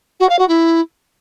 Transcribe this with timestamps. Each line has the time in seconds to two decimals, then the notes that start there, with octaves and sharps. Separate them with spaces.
0.20 F#4
0.29 F5
0.39 F#4
0.48 E4